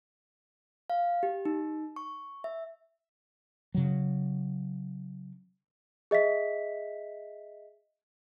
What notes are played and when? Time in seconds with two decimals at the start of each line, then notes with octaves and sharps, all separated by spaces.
0.90 F5
1.23 G4
1.45 D#4
1.96 C#6
2.44 E5
3.75 C#3 F#3
6.11 G#4 D#5 E5 B6